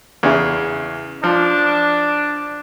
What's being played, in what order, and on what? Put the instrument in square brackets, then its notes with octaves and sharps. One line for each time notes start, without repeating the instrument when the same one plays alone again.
[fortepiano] E2 C#3
[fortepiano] F3 [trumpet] D4